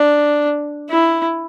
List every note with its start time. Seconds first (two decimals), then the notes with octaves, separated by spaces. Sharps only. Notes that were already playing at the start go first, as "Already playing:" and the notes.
Already playing: D4
0.90 E4